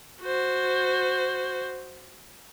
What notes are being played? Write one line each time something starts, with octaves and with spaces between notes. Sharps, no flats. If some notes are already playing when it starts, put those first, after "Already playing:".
F#4 C5